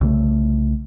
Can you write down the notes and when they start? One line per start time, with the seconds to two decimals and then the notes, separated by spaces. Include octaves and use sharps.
0.01 C2 C#3 A3